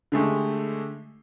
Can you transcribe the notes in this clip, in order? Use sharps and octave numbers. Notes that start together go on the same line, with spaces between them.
D3 G#3 A3 G4